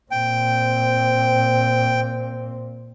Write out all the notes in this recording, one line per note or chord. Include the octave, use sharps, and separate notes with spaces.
A#2 C4 G5